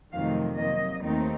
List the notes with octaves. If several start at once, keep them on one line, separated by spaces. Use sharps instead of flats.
F2 C3 D#3 F#3 A3 F5
C3 F#3 A#3 D#5
D#2 D#3 A3 C4 D#4